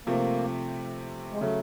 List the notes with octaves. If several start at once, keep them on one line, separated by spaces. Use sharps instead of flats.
C3 F3 A3 A#3 C4
G#3
C#3 F#3 A3